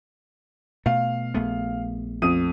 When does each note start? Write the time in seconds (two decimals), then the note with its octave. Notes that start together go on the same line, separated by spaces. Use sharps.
0.86 B2 A3 F5
1.34 A#1 A3 B3
2.22 F2 D#6 D#7